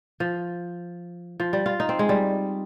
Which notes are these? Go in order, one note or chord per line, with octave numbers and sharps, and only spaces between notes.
F3
F3
G3
F4
D#4
C4
G#3
G3